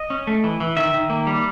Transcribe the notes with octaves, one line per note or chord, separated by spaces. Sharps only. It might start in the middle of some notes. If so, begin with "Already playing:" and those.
Already playing: D#5
C#4
A3
E3
E3
D#3 E5
D#3
A#3
G3